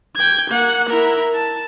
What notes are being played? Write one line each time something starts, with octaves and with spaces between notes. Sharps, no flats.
G5 G#6
A#3 F#5
E4 A#4
A5